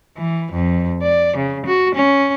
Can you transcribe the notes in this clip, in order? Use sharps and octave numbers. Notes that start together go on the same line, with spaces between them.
E3
F2
D5
C#3
F#4
C#4